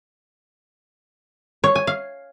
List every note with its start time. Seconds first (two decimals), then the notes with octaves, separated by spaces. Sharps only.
1.64 C#5
1.75 G#5
1.87 F5